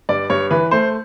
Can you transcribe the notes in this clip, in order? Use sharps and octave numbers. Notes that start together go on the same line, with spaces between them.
G2 D5
G2 C#5
E3 B4
A3 C5